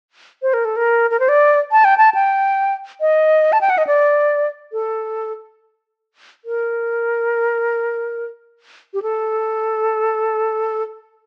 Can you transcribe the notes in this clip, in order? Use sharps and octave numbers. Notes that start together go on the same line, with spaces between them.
C5
A#4
A4
A#4
A#4
C5
D5
A5
G5
A5
G5
D#5
A5
G5
F#5
D#5
D5
A4
A#4
G4
A4